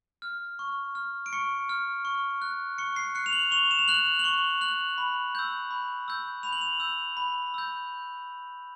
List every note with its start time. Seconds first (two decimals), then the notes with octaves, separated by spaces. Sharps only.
0.22 F6
0.59 C#6
0.95 F6
1.26 D7
1.33 C#6 C#7
1.69 F6
2.05 C#6
2.42 F#6
2.78 C#6 C#7
2.96 C7
3.15 F#6 C#7
3.26 F7
3.33 F#7
3.51 C#6 F7
3.71 E7
3.79 F7
3.88 F#6 F#7
4.19 F#7
4.24 C#6 G7
4.61 F#6 F#7
4.98 B5
5.35 E6 G6
5.71 B5
6.08 E6 G6
6.43 B5 F7
6.52 F#7
6.61 F7
6.80 E6 G6
7.17 B5
7.54 E6 G6